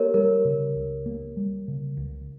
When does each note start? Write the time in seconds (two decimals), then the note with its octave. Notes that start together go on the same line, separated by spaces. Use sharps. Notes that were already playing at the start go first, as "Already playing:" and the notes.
Already playing: A#3 G4 A#4 C#5
0.14 G3 A#4
0.45 C#3
0.75 C#2
1.06 A#3
1.37 G3
1.68 C#3
1.97 C#2